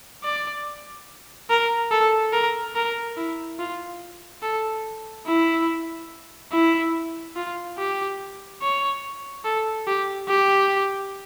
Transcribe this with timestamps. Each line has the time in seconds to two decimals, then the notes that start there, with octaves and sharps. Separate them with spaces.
0.24 D5
1.50 A#4
1.92 A4
2.33 A#4
2.75 A#4
3.17 E4
3.59 F4
4.43 A4
5.27 E4
6.52 E4
7.36 F4
7.78 G4
8.62 C#5
9.45 A4
9.87 G4
10.29 G4